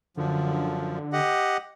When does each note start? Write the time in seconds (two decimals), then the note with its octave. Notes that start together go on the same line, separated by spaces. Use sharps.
0.17 F#2 D3 F3
1.13 G4 D#5 F#5